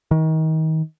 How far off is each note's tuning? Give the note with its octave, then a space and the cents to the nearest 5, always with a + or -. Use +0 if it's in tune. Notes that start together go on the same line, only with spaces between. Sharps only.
D#3 +30